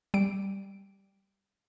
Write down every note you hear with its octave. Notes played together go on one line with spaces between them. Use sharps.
G3 D7